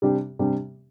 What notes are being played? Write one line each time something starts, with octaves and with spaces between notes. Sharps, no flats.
C3 G3 D4 G4
C3 G3 D4 G4